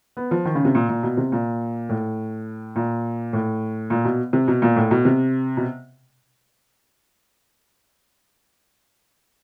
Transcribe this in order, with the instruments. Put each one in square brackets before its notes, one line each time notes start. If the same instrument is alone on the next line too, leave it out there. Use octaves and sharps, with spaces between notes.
[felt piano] B3
F3
D#3
C#3
C3
A#2
A#2
B2
C3
A#2
A2
A#2
A2
A#2
B2
C3
B2
A#2
A2
B2
C3
B2